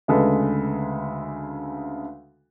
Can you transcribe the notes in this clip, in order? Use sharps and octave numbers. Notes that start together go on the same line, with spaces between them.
D2 C#3 G#3 A4 B4